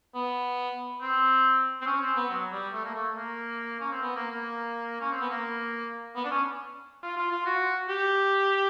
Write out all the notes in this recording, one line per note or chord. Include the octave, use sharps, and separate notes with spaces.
B3
C4
C4
C#4
C4
B3
F#3
G3
A3
A#3
A3
A#3
C#4
C4
B3
A#3
A#3
C#4
C4
B3
A#3
B3
D4
C#4
F4
F4
F4
F#4
G4